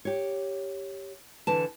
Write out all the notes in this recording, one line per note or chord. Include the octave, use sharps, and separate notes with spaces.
G4 C#5
D3 E3 A5